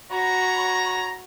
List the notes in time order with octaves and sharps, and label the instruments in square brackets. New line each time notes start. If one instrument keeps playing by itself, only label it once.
[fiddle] F#4 [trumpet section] C#5 A#5 [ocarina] B5